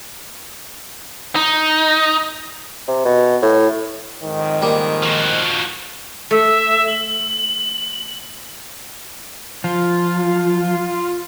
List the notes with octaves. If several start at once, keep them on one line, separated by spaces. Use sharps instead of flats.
D#4
C3
B2
A2
F2 G#2 D#3
G3 A#3
F3 F#4
A3 E5
F#7
F3 F4